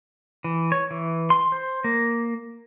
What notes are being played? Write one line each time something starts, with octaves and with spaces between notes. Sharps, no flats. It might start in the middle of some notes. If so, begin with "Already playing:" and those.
E3
C#5
E3
C6
C5
A#3